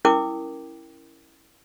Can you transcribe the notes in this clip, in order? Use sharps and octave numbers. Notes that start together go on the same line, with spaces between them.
C#4 E4 A#4 G5 D6 D#6